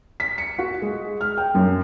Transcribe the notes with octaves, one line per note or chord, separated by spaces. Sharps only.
B6
C#7
F#4
G#3
F6
G5
F#2